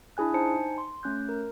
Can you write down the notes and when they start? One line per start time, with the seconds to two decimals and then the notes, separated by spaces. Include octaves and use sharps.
0.17 D4 E4 G#4 G#5 F#6
0.34 D#4 C5 G#5 A5 C#7
0.78 C6
1.03 A3 C#4 F#6 G6
1.29 A#4